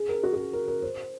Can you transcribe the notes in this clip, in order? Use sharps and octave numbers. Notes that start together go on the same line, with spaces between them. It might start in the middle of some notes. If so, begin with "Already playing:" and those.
Already playing: G#4
A#4
F#4
F#4
G#4
A#4
A#4
C5